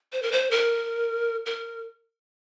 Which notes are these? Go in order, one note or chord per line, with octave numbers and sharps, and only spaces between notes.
C5
A#4
C5
A#4
A#4